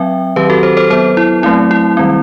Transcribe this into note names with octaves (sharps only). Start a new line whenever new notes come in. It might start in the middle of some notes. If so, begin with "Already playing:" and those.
Already playing: F#3 C4 E5 G5
D#3 F#3 C4 G4 B4
F#4 A4
A4 C5
A4 C5
F#3 B3 A4 C5
E4
F#3 A3 C4 E4
E4
D#3 G3 C4